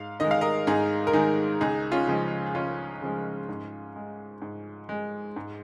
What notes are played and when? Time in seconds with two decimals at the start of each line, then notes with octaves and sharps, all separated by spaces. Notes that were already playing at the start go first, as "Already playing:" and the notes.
Already playing: G#2 F5
0.20 D#3 G#3 D#5
0.31 F5
0.41 A#4 D#5
0.67 G#2 D#4 G#4
1.07 A#4
1.13 D#3 G#3 D#4 G#4
1.61 C#2 D#4 G#4
1.92 C#4 F4
2.07 C#3 F3 G#3
2.46 G#4
2.54 C#2 C#4 F4
3.02 C#3 F3 G#3
3.49 G#2
3.96 G#3
4.42 G#2
4.89 G#3
5.36 G#2